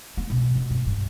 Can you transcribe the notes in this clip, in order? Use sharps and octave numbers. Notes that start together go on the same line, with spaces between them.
B3
B2
B2
G2
G2